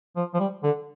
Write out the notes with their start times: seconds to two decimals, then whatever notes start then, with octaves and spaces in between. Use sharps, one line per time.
0.16 F3
0.34 F3
0.40 G3
0.63 D3